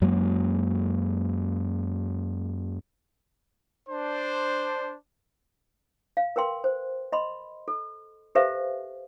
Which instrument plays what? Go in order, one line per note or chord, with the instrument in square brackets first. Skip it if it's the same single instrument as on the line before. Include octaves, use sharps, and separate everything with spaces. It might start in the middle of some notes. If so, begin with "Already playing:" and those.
[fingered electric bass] F#2 F#3 G#3 A#3
[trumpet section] D4 C5
[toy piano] F5
A#4 B4 G5 C6
C5
D#5 B5 C6
A4
G4 A4 B4 C5 E5 F5